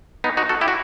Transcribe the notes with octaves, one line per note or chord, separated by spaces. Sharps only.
B3 D#4
D#4 F#4
F#4 A4
E4 G4
F#4